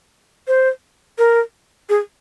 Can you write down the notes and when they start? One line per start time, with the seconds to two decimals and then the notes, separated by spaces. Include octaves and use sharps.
0.48 C5
1.18 A#4
1.89 G#4